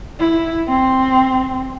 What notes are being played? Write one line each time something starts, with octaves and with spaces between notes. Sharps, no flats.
E4
C4